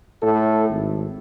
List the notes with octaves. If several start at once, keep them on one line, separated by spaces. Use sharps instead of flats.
A2 A4
G#1